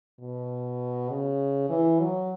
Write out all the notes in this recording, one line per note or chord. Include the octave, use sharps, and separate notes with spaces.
B2
C#3
E3
F#3